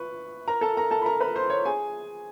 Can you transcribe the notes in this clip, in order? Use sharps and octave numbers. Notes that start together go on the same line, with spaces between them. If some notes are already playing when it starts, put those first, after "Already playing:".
Already playing: B4 C#6
A#4 A#5
A4 A5
A#4 A#5
A4 A5
B5
A#4 A#5
B4 B5
C5 C6
C#5 C#6
G#4 G#5